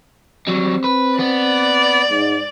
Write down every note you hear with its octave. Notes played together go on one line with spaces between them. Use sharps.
F#3 G3 C4
B4
B3 D5
G#2